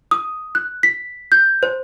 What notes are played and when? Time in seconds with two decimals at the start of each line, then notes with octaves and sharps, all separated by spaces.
0.11 D#6
0.55 F#6
0.83 B6
1.32 G6
1.63 C5